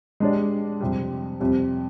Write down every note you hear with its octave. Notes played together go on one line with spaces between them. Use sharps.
G#3 D4 G4 D5
F2 C3 G3
F2 C3 G3